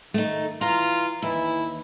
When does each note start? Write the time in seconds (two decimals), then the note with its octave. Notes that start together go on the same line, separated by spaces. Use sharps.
0.14 D#3 A3 D#4
0.61 E3 F4 A#5
1.22 D#2 E3 E4